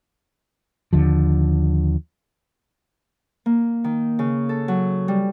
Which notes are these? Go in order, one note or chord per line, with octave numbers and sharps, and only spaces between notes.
D#2 D3 F3
A#3
D#3
C#3
A4
F#3
G3